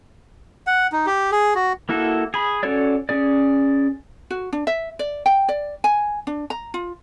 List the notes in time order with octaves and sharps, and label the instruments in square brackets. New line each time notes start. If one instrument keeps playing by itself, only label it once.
[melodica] F#5
D#4
G4
G#4
F#4
[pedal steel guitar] A#3 E4 F#4 A4
G#4 B5
C#4 F#4 A4 C#5 D5
C#4 G#4 D5
[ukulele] F#4
D4
E5
D5
G5
D5
G#5
D4
A#5
F4